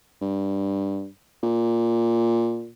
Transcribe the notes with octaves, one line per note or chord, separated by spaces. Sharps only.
G2
A#2